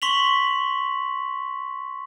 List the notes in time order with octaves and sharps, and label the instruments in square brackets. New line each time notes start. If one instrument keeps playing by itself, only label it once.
[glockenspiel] C6 C#6 B6 F7 F#7